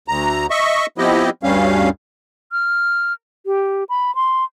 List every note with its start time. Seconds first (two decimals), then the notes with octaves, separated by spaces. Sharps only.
0.08 D2 A#5
0.50 D#5 E5 C#6
0.98 F3 B3 C4 E4 G4 D#5
1.43 D2 G2 G3 C#4 F5
2.52 F6
3.46 G4
3.89 B5
4.15 C6